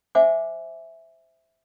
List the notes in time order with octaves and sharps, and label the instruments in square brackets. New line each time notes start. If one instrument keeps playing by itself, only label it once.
[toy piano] C5 E5 F#5 G#5 D6